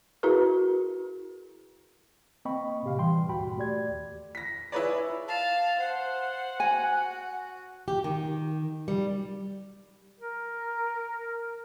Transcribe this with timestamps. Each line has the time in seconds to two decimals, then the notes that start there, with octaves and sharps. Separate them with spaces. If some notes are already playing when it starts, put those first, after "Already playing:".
0.23 E4 F#4 G#4 A#4 B4
2.45 A#3 C4 D#5 G5 B5 C#6
2.83 A2 C3 G4 F5
2.98 E3 G3 G5 C6
3.28 D2 G2 A#2 F#4 G5 B5
3.57 A3 G4 D5 G#6
3.88 D#2
4.35 A#6 B6
4.72 E4 G#4 B4 C#5 D5
5.28 F5 A5
5.79 C5 F#5
6.60 F#4 G#5
7.88 G4
8.04 D#3
8.88 G3
10.20 A#4